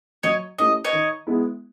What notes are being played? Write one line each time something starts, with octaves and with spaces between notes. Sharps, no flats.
F#3 C#5 D#5
A3 C#4 E4 G4 D#5
C#5 D#5
D#3
G#3 B3 E4